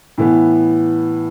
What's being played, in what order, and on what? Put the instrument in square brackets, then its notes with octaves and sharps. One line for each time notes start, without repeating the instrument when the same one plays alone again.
[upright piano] A2 E3 B3